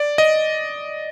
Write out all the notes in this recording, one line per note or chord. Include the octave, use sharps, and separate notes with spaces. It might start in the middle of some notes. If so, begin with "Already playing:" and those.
Already playing: D5
D#5